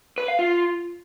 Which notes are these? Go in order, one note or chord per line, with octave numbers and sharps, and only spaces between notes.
B4
F5
F4